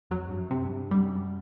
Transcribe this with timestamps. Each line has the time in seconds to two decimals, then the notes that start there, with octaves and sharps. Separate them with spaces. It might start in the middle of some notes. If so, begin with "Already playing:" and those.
0.11 F2 F#3
0.29 G2
0.37 F#2
0.51 C3
0.64 G2
0.91 F#2 G3